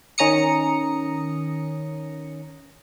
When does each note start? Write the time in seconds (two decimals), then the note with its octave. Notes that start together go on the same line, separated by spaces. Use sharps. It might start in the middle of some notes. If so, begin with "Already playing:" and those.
0.18 D#3 C#4 A#5 D#6 C#7